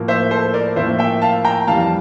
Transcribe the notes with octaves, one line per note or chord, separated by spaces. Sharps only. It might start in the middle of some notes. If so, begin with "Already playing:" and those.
Already playing: A2 F3 A#3
C5 E5
A4 C5
A#4 D5
A2 F3 A#3 C5 E5
E5 G5
F5 A5
G5 A#5
F2 E3 G3 F5 A5
A5